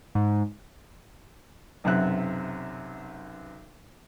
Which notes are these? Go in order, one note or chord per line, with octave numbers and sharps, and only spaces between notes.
G#2
B1 F#2 C3 E5 F#6